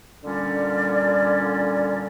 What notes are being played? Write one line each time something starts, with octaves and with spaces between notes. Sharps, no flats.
A#2 D3 G3 C#4 D5